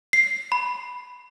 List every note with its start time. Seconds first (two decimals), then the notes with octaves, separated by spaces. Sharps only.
0.13 C7
0.52 B5